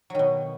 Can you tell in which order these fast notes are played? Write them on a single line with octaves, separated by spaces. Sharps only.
F#3 D#3 B2